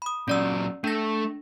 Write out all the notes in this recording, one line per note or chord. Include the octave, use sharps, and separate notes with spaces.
B5 D#6
A#2 F#3 C#4 D5 E6
A3 D4 A#6